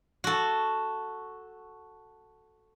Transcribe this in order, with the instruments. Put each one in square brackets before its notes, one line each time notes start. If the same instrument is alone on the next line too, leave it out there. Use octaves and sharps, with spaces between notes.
[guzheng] F#4 A4